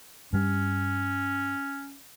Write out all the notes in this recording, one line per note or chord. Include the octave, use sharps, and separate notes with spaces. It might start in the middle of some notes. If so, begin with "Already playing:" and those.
G2 G3 C#4